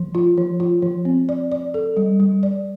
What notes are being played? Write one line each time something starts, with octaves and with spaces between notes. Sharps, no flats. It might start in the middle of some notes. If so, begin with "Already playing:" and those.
Already playing: F3
F4
F3
F4
F3
C4
D5
D5
A4
G3
G3
D5